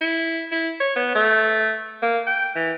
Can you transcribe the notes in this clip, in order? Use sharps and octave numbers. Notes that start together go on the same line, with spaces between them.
E4
E4
C#5
B3
A3
A#3
G5
E3